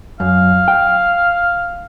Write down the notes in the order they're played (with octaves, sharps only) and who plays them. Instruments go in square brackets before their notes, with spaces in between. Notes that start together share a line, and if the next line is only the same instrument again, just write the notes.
[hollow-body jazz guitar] F#2 [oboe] F5
[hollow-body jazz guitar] G5